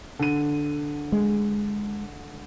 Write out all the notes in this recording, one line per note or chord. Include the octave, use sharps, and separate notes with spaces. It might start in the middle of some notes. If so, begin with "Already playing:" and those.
D3 D#7
G#3